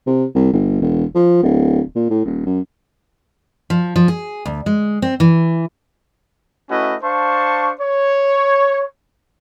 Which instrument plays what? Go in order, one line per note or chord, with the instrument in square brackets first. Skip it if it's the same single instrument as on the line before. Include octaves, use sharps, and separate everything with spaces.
[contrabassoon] C3
C2
G1
E1
F3
D1
A#2
A2
D#1
F#2
[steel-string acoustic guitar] F3
F3
G#4
D2
G#3
C4
E3
[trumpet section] A3 C#4 E4 F#4 B4 D#5
D4 C5 F5 A5 C#6
C#5